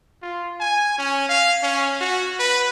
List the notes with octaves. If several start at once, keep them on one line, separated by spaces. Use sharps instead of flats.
F4
G#5
C#4
F5
C#4
F#4
B4